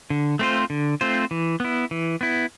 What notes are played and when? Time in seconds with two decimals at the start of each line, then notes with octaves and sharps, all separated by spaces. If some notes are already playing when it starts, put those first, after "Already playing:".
0.10 D3
0.39 A3 C4 F4 C5
0.70 D3
1.01 A3 C4 F4 C5
1.31 E3
1.60 B3 E4
1.91 E3
2.21 B3 E4